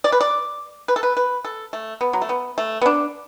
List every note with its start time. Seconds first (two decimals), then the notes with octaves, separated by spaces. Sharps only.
0.04 D5
0.12 B4
0.21 D5
0.88 B4
0.96 A4
1.03 B4
1.17 B4
1.44 A4
1.73 A3
2.01 B3
2.13 F#3
2.22 A3
2.29 B3
2.58 A3
2.81 B3
2.86 D4